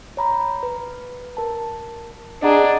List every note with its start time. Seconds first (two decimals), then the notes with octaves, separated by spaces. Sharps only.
0.17 C#5 A#5 B5
0.63 B4
1.37 A#4 A5
2.43 D4 G#4 D#5 F#5 A#5